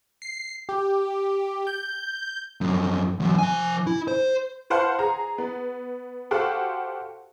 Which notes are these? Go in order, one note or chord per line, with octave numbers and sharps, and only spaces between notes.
C7
G4
G6
F#2 F3
E2 F#3
F3 G#5
E4
C5
B4 C5 F5 F#5 A5 C6
G#4 A#5
B3
F#4 G4 A4 C5 F5 F#5